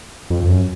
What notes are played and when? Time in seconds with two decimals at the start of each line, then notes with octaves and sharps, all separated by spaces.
0.30 F2
0.44 F2
0.48 F#2